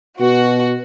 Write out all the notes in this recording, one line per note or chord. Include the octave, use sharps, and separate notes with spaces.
B2 F#4